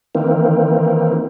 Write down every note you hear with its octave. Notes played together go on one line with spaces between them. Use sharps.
D#3 E3 A#3 C4